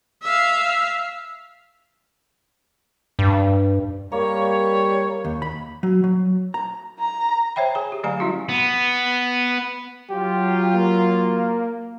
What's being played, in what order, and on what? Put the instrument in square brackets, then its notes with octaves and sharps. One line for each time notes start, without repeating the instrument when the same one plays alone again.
[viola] E5 F5
[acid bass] G2
[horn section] G3 C#5 [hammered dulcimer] A#3
[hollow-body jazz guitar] D#2
B5
F#3
F#3
A#5
[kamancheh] A#5
[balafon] C5 C#5 E5 G5 B5
G#4 G#5 A#5
G4
D3 F#3 A3 F5 G#5 A#5
G3 C#4 E4 F#4
[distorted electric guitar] B3
[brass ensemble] F#3 F4 [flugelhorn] G4
[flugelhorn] A#3